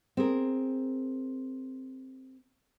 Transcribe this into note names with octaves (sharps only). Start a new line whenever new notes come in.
C4 G#4 A#4